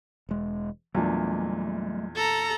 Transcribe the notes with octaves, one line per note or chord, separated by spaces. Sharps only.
E1 G#3
E2 A#2 F#3 G3 A3 D4
A4 A#5